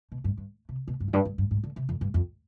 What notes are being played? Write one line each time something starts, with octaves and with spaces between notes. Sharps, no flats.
B2
G2
G2
C3
B2
G2
F2
G2
G2
G2
G#2
D3
C3
F2
G2
F2